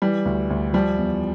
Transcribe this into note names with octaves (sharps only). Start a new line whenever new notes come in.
E3 G3
D2
D2
F3 G3
E2